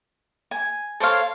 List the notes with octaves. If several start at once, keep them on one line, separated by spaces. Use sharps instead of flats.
G#5
A4 C5 C#5 F5